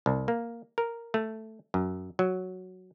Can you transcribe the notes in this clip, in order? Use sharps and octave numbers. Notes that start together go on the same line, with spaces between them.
C2
A#3
A#4
A3
F#2
F#3